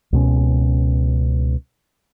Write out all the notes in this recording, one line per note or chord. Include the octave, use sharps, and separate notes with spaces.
C#2 B2 C#4